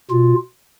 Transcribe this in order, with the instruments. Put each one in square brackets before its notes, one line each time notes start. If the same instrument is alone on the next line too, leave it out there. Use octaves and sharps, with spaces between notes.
[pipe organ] B2 F4